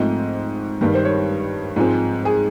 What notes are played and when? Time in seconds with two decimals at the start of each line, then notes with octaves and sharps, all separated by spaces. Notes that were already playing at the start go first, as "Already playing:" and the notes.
Already playing: G#2 F3 A3 C4 D#5
0.81 G2 D#3 G3
0.95 C5
1.05 C#5
1.76 G#2 F3 G#3 C4
2.25 G#4